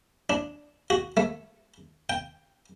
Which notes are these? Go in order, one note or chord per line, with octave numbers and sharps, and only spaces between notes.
D4
F#4
A3
G5